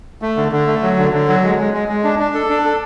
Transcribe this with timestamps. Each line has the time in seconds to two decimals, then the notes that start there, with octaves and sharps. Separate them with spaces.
0.22 A3
0.37 D3
0.52 D3
0.67 A3
0.83 F#3
0.98 D3
1.13 D3
1.28 F#3
1.43 G#3
1.58 G#3
1.74 G#3
1.88 G#3
2.04 D4
2.19 D4
2.35 A4
2.50 D4
2.65 A4